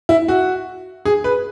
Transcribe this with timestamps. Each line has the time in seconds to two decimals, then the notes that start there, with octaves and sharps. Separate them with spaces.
0.09 E4
0.28 F#4
1.05 G#4
1.24 B4